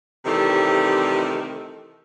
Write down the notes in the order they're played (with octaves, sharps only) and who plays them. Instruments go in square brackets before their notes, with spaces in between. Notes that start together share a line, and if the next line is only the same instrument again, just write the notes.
[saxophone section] C3 D#3 E3 G3 A3